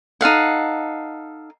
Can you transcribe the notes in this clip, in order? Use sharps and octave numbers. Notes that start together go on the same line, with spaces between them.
D#4 A4 F5 F#5